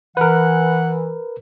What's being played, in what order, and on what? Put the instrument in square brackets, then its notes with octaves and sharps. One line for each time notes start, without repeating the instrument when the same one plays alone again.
[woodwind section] E3 [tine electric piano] A#4 B4 [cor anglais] F#5